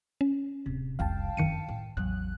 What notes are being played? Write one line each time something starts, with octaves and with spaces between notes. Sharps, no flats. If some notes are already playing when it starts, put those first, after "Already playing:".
C#4
D1 C3
F1 C2 F5 G5 A5
F#1 F2 D#3 C#7 D#7
A2
A1 E2 F#3 F#6